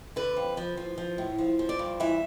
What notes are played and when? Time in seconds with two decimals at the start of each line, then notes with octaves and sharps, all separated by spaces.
0.16 D3 B4
0.37 F2
0.57 F3
0.77 F3
0.98 F3
1.18 A2
1.39 F3
1.59 F3
1.69 D5
1.79 G2
2.00 E3 E5